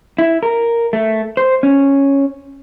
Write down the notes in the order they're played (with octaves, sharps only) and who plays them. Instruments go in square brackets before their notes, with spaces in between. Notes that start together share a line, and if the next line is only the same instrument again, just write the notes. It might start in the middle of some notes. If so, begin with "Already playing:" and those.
[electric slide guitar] E4
A#4
A3
C5
C#4